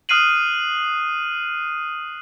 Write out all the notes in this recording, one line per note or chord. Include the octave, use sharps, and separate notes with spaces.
D#6 F6 F#6 C7 D#7 F#7